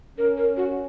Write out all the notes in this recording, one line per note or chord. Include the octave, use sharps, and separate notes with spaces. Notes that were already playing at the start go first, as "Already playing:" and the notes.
C#4 A#4
A#4
F#4